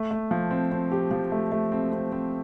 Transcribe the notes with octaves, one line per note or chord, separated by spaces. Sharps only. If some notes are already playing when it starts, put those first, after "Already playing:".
Already playing: A3
A3
F3
C4
C4
G4
F3
A3
A3
C4
C4
C4